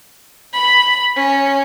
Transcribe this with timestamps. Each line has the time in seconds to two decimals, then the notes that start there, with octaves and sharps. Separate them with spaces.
0.54 B5
1.17 C#4